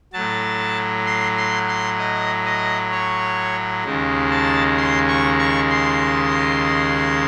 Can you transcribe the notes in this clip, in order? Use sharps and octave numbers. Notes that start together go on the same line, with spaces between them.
A2 F#3 A5
C6
C6
C6
D#5
D#5
C#5
D#2 C#3 G#3
A5
C6
C#6
C#6
C6